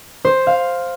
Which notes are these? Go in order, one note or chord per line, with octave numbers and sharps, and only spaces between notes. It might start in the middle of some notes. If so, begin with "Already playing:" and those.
C5
F5